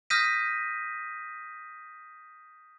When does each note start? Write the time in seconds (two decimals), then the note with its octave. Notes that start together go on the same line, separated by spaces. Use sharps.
0.10 D#6 F6 G6 A#6 B6 D#7